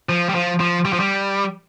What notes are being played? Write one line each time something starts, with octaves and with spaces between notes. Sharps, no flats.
F3
G3
F3
F3
G3
F3
G3